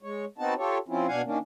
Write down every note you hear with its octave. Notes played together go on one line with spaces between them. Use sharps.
G#3 C#5
B3 C4 D#4 F#4 A5
F4 G4 A4 C#5
F3 C4 C#4 E4 F4
B2 D4 F5 F#5 G#5
D#3 A#3 C#4 D4